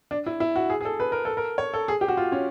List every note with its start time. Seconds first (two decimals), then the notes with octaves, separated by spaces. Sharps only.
0.11 D4
0.26 E4
0.40 E4
0.56 F#4
0.70 G#4
0.81 G#4
0.85 A4
1.00 B4
1.12 A#4
1.25 A4
1.37 A#4
1.58 C#5
1.74 A4
1.88 G#4
2.01 G4
2.08 F#4
2.17 F4
2.32 C#4